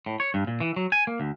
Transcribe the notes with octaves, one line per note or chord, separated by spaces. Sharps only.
A2
C#5
G2
A#2
E3
F#3
G#5
A#3
D2